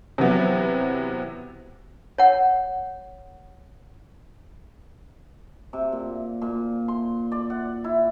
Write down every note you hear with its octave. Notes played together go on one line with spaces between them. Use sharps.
C3 E3 F#3 B3 E4
C#5 F#5
C3
A#2
A#2
C6
D5
F#5
E4